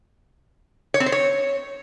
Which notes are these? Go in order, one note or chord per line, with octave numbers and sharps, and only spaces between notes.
C#5
C4
C5
C#5